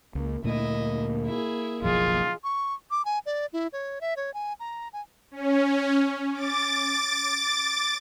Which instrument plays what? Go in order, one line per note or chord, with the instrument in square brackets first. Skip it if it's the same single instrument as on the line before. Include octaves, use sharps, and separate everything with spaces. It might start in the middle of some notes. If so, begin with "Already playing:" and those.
[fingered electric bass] C#2 [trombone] A#3
[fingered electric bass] D2 A#2 A3 [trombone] A#3 [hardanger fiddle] E4 D#5
[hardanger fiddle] E4 G#4
[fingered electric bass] F#1 B1 F3 [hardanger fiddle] G#3 G#4 [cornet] F4
[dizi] C#6
D6
G#5
D5
E4
C#5
E5
C#5
G#5
A#5
G#5
[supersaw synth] C#4
D6 A6